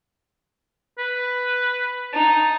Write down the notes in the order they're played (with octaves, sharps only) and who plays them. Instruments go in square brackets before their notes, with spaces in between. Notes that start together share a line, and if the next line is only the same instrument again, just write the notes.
[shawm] B4
[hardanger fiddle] D#4 [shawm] A5